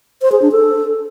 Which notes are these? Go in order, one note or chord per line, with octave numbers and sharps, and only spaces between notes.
C5
G#4
D4
A4